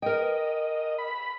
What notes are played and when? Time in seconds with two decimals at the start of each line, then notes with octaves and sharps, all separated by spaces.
0.02 A#4 D#5 G5
0.98 B5